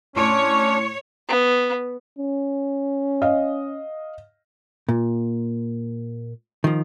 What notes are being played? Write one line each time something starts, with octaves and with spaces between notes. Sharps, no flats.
A2 C#4 D4 C#5 C6 D7
B3
C#4
D#5 F5
A#2
D#3 F3